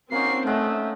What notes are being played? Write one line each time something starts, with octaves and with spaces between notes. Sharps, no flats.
A#3 C4 C#4 D#4 F#4 C7
A3 C#4 D#5 E5 F#5